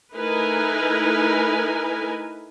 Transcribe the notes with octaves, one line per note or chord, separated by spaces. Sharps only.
A3 D#4 E4 A#4 B4 G#5